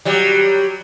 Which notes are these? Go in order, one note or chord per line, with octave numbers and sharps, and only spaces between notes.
F#3 G3